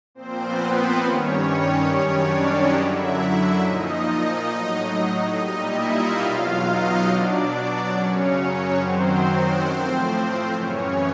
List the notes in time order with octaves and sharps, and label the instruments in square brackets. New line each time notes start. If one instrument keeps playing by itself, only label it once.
[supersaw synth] A#2 F3 C4 C5
B3 B4
C4 C5
G2 D#3 G3 C#4 C#5
C#4 C#5
F#2 D#3 G3 C#4 C#5
D4 D5
D#4 D#5
F#2 D3 F#3 E4 E5
A#2 F3 D#4 D#5
A2 F#3
A#2 G3 D#4 D#5
E4 E5
F4 F5
E2 B2 F#3 F4 F5
D#4 D#5
B2 F#3 D4 D5
F#2 C#3 F#3 C#4 C#5
F#2 D#3 F#3 C4 C5
A2 F3
F#2 C#3 E3 C#4 C#5